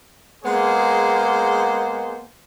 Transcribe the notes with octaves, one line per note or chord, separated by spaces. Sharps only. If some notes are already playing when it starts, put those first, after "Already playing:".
G#3 A#3 B3 G#4 C5